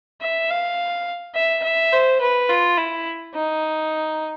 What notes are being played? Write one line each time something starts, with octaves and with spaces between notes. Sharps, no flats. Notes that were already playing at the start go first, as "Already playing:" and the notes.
E5
F5
E5
E5
C5
B4
F4
E4
D#4